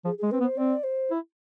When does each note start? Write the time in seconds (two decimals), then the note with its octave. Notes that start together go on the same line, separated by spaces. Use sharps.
0.05 F3 G#4
0.18 G#3 G#4
0.31 C4 B4
0.40 B3
0.44 C5
0.57 C4 D5
0.83 C5
1.11 E4